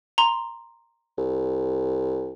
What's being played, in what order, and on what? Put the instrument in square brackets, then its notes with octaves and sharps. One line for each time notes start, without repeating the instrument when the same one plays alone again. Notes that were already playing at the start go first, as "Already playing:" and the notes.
[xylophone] A#5 C6
[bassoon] C2